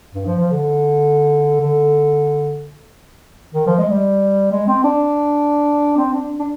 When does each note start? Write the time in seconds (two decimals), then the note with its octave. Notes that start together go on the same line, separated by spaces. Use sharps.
0.15 G2
0.26 F3
0.39 F3
0.51 D3
1.61 D3
3.54 D#3
3.67 F3
3.79 G#3
3.91 G3
4.52 G#3
4.68 C4
4.84 D4
5.97 C4
6.14 D4
6.40 D4